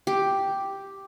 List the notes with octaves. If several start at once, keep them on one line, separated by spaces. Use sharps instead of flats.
G4